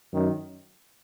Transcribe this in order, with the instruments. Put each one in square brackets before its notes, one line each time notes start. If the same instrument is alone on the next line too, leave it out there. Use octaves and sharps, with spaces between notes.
[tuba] F#2 [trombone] D#3